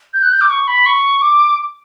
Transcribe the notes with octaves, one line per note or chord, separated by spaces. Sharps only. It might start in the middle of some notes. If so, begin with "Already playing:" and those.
G6
F#6
G6
D6
C#6
B5
C#6
D6